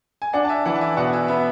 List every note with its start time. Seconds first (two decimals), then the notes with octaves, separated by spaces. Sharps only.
0.22 G#5
0.33 D4 D5 F#5
0.45 A5
0.49 E5 G#5
0.65 E3 D5 F#5
0.75 A5
0.81 E5 G#5
0.97 B2 D5 F#5
1.13 E5 G#5
1.28 B3 E5